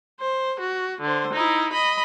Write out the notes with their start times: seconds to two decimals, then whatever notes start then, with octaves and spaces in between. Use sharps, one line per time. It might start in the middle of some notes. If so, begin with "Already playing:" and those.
0.20 C5
0.60 F#4
1.01 D3 C5
1.34 D#4 E4
1.73 D#5 B5